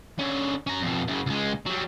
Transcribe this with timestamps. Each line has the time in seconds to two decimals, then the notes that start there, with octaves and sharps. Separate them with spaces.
0.19 D3 C#4
0.67 C#4 A#5
0.82 F2 B2
1.08 F#2 C#3
1.26 C#2 G#3
1.66 F#3 G3